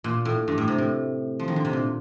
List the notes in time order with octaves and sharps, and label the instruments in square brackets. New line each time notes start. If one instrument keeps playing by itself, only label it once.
[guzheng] A#2
A2
G2
A2
C3
A2
F3
D#3
D3
C3
A#2